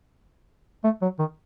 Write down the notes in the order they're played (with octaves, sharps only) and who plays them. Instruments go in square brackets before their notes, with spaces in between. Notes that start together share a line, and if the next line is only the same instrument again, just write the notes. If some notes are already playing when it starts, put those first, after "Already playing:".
[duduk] A3
F#3
D#3